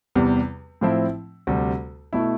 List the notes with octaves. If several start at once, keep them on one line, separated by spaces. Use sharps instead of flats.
E2 C3 G3
A2 F3 C4 E4
D2 C3 G3
B2 A3 E4